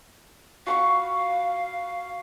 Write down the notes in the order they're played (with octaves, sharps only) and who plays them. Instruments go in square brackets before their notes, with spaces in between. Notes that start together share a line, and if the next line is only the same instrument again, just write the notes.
[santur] F#4 B5 C#6 [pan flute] F5